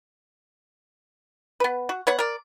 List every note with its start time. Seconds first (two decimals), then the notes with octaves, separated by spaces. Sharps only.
1.60 B3 B4
1.89 F#4
2.07 B3 C#5 F#5
2.19 A#4 D5